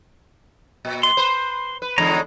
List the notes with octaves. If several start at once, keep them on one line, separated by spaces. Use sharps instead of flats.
A#2
C6
B4 C5
B4
E2 D3 G#3 D#4 C#5 A#5